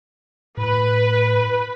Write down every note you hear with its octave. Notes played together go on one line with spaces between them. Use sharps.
A2 B4